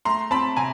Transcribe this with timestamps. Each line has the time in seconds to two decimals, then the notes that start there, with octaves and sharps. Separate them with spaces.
0.05 A3 A#5 C6
0.31 C4 A5 B5
0.56 C3 G#5 A#5